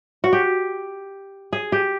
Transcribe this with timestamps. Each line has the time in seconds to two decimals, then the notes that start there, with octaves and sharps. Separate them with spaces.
0.24 F#4
0.33 G4
1.53 G#4
1.72 G4